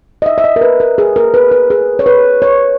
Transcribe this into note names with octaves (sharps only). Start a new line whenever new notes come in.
D#5
E5
E5
D#5
A#4
B4
A#4
G#4
A#4
B4
B4
G#4
C#5
B4
C#5